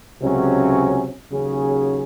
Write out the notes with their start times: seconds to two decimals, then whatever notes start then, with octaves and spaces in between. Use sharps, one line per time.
0.21 C#2 C3 F#3 C#4
1.31 D#2 C#3 F#3 C#4 G#4